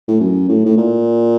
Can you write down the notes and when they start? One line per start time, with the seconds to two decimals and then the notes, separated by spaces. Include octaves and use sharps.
0.08 A2
0.20 F#2
0.48 A2
0.66 A2
0.77 A#2